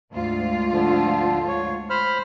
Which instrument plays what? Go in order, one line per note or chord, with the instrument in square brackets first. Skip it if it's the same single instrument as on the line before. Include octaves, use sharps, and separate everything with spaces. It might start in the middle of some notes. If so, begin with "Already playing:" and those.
[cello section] D2 G#2 F4
[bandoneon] D3 F3
C#5
C5 B5 F6